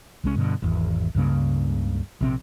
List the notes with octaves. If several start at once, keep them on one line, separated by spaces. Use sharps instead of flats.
C2 G#3 C#4
G2 B2 D3
G#1 E2
C#2 G2 C#3 A#3
A#1 C3 C4